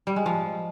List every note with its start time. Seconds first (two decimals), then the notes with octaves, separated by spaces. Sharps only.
0.07 G3
0.16 G#3
0.26 F3